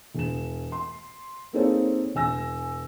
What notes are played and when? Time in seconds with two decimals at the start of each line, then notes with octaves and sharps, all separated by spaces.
0.15 E1 E7
0.72 C6
1.53 A#3 C4 D#4 G#4 A4 C#5
2.15 E1 G#5 E6 A#6